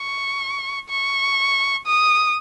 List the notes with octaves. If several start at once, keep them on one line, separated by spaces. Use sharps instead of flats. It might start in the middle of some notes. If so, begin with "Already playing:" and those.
Already playing: C#6
C#6
D#6